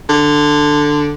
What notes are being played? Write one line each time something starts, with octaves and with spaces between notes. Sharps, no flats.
D3